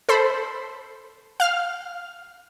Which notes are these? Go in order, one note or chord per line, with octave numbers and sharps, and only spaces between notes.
A4 C5 B5
F5 F6